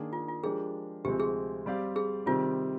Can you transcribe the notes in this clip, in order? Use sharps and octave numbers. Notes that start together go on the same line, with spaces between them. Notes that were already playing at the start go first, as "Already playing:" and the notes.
Already playing: D#3 A#3 D4 G#4
F4
F4
F3 G#3 D4 G4 G#4 A#4
D2 C3 F3 G#3 C4 G4
G#4
G3 C4 G4 D5 F5
G#4
C3 D#3 G3 C4 F4 G4